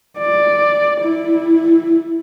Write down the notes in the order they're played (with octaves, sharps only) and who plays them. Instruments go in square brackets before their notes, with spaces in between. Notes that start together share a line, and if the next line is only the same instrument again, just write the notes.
[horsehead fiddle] D5
E4